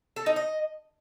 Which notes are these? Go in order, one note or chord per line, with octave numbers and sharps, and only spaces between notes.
A4
D#4
D#5